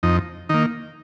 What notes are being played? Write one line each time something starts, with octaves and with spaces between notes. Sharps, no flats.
F2 D#4
D#3 A#3 D#4